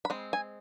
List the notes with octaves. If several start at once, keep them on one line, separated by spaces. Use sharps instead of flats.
B5
G#3 C4
G#5